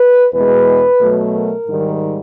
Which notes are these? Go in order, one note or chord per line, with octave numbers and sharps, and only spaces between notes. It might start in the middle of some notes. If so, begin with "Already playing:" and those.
Already playing: B4
E2 B2 G#3 B4
B2 F#3 A3
A#4
G#2 D#3 G3